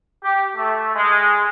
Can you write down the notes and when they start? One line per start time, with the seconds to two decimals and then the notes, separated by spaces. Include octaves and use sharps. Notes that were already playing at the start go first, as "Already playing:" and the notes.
0.23 G4
0.56 A3
0.95 G#3